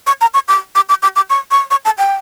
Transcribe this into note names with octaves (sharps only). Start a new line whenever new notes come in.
C#6
A#5
C#6
D6
D6
D6
D6
D6
C#6
C#6
C#6
A5
G5